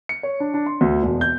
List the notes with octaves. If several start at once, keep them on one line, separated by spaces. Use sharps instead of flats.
C#7
C#5
D4
D4
C6
D2
E1
G6